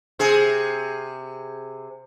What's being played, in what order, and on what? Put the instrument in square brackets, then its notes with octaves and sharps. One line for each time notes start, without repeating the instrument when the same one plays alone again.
[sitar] C3 G#4